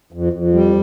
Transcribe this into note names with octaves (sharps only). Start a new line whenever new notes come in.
F2
F2
G3